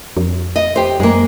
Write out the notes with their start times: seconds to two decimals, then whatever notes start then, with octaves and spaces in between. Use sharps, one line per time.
0.17 F2
0.56 D#5
0.76 G4 C5
1.00 F#2 G#3 A#3